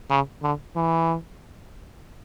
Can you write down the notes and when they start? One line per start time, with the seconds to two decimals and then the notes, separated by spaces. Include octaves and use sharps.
0.10 C#3
0.43 D3
0.76 E3